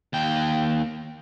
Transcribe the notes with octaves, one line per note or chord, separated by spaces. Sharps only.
D#2 G5